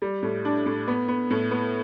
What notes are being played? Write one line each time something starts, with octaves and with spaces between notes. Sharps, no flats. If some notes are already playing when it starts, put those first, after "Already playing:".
G3
A2
D4
A2
B3
B3
A2
B3